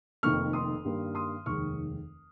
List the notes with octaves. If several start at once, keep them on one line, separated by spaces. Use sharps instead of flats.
F1 F2 D#3 A#3 C#6 F6
C6 D#6
G2 D#3 G3 A#3
C6 D#6
F1 D#2 D#3 G#3 C#6 F6